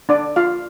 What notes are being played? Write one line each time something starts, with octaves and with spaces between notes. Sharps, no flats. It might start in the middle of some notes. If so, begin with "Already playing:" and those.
D4 D5
F4 F5